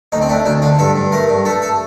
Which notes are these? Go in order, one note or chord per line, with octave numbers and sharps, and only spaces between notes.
D2 D#4
C4
A3 D4
D2 D4
D3 F4
G2 A4
G2
A3 A#4
G2
A3 A4
A4